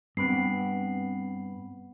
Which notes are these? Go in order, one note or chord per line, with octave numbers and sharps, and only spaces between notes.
G2 B3 C4 B5 C7